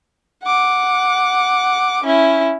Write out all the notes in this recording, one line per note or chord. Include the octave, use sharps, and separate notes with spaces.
F#5 D6
C#4 E4